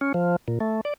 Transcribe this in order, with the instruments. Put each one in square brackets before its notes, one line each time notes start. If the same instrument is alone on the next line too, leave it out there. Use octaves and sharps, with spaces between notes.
[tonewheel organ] C#4
F3
A#2
A3
D5